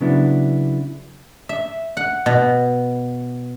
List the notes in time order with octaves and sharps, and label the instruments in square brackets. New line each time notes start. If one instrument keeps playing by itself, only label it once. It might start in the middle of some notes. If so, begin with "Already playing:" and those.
[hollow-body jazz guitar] C#3 F#3 B3 D4 E4
[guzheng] E5
F#5
B2